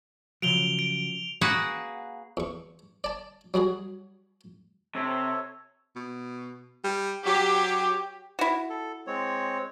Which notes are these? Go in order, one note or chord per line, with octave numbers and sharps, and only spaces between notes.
C#3 F3 F#3 D7 F7 G7
D7
A#3 F#4 G#4 B4 F#5
E2 C#6
D5 A5
F#3 G3 F#4 G#4
C3 A4 C#5
B2
G3
F#3 G4
E4 F#4
A4
G#3 C4 C#5